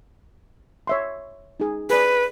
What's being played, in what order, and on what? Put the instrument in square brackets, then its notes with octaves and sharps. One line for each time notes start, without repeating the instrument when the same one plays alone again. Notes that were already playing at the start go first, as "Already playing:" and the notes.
[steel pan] C#5 E5 C6
D#4 G#4
[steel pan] G#4 D5 [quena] B4